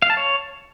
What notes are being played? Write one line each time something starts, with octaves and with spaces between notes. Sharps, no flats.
F5
A5
C#5